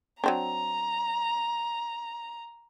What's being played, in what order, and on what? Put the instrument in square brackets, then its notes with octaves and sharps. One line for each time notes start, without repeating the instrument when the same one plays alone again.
[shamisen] F#3 C4 D4 [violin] A#5